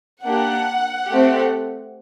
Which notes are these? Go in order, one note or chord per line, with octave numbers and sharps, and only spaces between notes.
A#3 D4 G4 F#5
A3 C4 G4